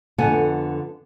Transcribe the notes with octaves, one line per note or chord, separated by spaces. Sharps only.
F2 D3 B3 A4 F#5 G#5